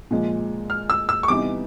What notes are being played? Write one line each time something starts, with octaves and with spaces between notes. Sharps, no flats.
A#2 F3 G#3
F6
E6
E6
C#6
C3 E3 G3 B3 D#4 D6